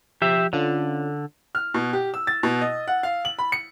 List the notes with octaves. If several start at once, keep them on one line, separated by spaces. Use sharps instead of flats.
F3 G4 E5
D3 C#4 F4 A4
F6
B2
G4
E6
A6
B2
D#5
F#5
F5
F#7
B5
C#7